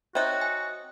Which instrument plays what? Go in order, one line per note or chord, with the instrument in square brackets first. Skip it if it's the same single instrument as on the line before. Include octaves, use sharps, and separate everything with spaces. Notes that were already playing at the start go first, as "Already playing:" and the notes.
[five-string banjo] C4 D#4 [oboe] F#4 [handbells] C#5 E5 F#6
[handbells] G#5